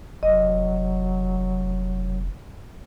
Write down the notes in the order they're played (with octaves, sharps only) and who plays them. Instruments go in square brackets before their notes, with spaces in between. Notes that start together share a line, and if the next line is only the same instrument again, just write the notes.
[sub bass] F1 [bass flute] F#3 [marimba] D#5